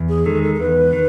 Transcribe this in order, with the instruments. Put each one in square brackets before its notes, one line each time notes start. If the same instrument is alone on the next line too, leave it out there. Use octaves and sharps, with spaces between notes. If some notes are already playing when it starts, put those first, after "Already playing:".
Already playing: [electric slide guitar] E2
[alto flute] G#4
[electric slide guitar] D#3 G#3 [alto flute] A4
[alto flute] A4
A4
[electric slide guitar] E2 [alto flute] B4
[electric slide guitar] D#3